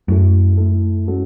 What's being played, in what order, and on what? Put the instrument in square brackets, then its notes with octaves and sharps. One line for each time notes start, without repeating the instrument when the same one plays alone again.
[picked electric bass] F#2 [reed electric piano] A3 E4 A4
[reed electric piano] A3 E4 A4
G#3 C#4 F#4 A4